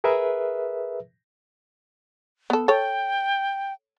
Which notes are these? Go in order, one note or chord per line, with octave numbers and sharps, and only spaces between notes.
G#4 A#4 B4 E5
B3 A4
A4 C#5 G5